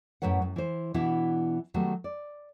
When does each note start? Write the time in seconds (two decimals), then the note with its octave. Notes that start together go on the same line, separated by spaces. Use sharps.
0.22 F#2 A2 F#3 B4 F#5
0.42 F#2
0.56 E3 C5
0.94 B2 E3 B3 D4 E4 F#4
1.74 D#3 F#3 G3 A3 B3
2.04 D5